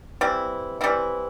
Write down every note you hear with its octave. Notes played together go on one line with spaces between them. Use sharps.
E3 G3 C4 E4
E3 G3 C4 E4